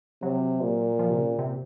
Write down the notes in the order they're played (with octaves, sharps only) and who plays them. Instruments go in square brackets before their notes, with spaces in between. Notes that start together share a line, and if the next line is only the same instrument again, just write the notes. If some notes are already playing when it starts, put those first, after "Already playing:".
[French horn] C3 [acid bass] F#3
[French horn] A#2
[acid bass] F3
C3
C#3
C3